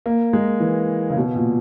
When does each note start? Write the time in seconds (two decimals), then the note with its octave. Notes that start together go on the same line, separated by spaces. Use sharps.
0.06 A#3
0.33 G#3
0.60 E3
1.10 C#3
1.17 B2
1.35 A#2